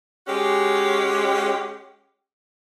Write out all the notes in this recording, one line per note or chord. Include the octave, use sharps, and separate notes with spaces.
G#3 C#4 F#4 G4